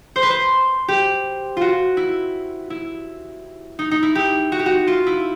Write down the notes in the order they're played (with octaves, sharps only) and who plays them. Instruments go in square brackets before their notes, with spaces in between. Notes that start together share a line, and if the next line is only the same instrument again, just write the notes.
[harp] C5
B4
C5
G4
F4 F#4
E4
E4
D#4
D#4
E4
G4
F#4
G4
F#4
F4
E4